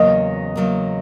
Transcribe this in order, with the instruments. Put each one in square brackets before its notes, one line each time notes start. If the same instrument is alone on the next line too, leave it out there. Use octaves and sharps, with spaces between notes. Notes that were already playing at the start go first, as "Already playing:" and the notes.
Already playing: [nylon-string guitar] E2 C#3 F#3 A#3 [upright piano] D#5
[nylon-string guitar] E2 C#3 F#3 A#3